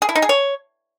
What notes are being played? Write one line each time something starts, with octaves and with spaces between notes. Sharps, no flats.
G#4
E4
D#4
G#4
C#5